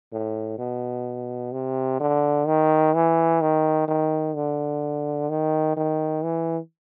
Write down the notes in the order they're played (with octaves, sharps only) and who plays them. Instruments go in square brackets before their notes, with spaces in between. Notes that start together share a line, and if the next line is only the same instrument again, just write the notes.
[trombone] A2
B2
C3
D3
D#3
E3
D#3
D#3
D3
D#3
D#3
E3